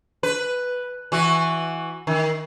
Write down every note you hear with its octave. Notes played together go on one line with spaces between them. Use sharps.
B4
E3 F#4
D#3